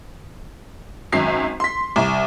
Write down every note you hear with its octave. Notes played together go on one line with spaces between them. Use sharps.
G#1 F#2 C7
C6 B6
C2